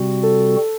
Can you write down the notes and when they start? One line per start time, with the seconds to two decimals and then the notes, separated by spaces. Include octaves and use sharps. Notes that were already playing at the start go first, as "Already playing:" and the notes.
Already playing: C3 G3 C4 F#4
0.23 A4